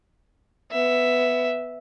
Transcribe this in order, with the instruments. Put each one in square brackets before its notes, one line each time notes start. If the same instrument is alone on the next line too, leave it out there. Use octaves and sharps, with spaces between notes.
[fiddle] B3 E5